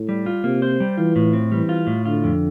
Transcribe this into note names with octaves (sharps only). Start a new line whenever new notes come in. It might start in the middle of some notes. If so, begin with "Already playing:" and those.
Already playing: A2
G3
F4
C3 A#3
C5
G3
E3 F4
A2
C4
E3 G3
F4
A2
D3 F4
F2